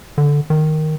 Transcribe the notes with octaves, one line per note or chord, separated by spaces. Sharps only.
D3
D#3